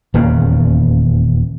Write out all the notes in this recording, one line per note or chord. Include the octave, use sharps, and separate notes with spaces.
D#1 E2 C#3 A#3